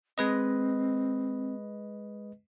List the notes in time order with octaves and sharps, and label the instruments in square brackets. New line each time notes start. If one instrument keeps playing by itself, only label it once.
[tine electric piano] G#3 B4 D#5 [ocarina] C4